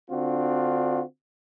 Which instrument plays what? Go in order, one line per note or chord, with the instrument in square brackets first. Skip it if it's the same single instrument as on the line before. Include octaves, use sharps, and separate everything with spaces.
[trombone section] D3 C4 D4 F4 F#4